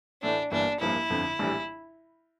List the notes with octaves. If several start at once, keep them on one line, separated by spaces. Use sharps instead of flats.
A2 E3 A3 D4 E4
G1 G2 E3 A#3 D4
A1 G2 F3 A#3 E4
G1 F2 D3 F3
A#1 A2 E3 G3 D4